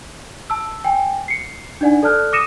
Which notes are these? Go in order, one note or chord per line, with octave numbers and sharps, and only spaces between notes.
A5 E6
G5 G#5
C7 C#7
D4 D#4 D5 F#5 G#5
A4 D5 A5 F6 F#6
D6 D#6 A#6 C#7 D#7 E7